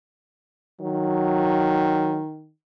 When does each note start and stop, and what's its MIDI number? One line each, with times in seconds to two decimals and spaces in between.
0.81 2.51 51
0.81 2.20 54